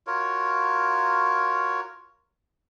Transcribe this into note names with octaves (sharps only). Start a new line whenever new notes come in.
F4 F#4 A#4 C#5